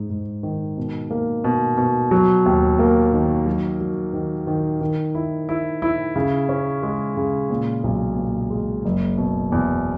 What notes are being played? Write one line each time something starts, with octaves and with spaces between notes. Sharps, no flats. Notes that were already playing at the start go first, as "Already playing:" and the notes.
Already playing: G#2 D#4
G#2
D#3
B2
A#3
B2
B2
F#3
D#2
A#3
D#3
F#3
F#3
D#3
D#3
D#3
E4
E4
E4
C#3
C#4
G#3
C#3
A#2
B1
A#2
G#3
F#1
B2
E2